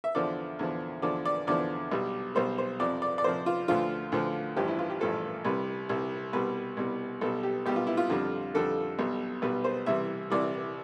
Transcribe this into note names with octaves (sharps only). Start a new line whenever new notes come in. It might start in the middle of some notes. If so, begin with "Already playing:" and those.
E5
E2 D3 F3 D5
E2 D3 F3
E2 D3 F3 D5
D5
E2 D3 F3 D5
B1 B2 G3
B1 B2 G3 C5
C5
F2 C3 F3 D5
D5
D5
F2 C3 F3 C5
F4
D2 D3 F3 F4
D2 D3 F3
A1 G2 F3 G4
E4
F4
G4
A1 G2 F3 A4
C2 C3 G3 B4
C2 C3 G3
C2 B2 G3 B4
C2 B2 G3
B1 B2 G3 A4
G4
B1 B2 G3 G4
F4
E4
F4
F2 D3 G3
F2 D3 G3 A4
B1 B2 G3
B1 B2 G3 B4
C5
C2 C3 E3 G3 E5
C2 C3 E3 G3 D5